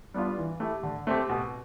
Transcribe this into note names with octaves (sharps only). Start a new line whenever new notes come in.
G3 B3 D4 F4
E3
A3 E4 G4
D3
A3 C4 G4
B2